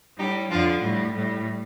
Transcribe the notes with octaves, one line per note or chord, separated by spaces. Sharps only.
A2 G3 D#4 G4
F2 D3 F3 D4 F4
A2 G3
A2 G3